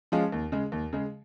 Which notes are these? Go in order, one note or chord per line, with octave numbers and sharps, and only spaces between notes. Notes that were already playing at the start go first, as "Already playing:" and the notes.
F3 G#3 C#4 F4
D#2
C#3 G#3
D#2
C#3 G#3